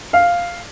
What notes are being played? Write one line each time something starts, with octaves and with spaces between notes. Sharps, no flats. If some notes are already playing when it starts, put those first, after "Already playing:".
F5